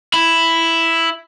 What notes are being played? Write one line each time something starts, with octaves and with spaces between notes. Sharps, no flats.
E4